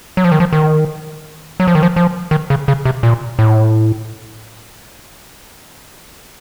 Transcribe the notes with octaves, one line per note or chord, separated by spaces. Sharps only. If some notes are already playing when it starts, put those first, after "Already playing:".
F#3
F3
D#3
F3
D#3
F#3
F3
D#3
F3
F3
D#3
C#3
C#3
C3
A#2
A2